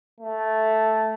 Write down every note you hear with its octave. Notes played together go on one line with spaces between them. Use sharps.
A3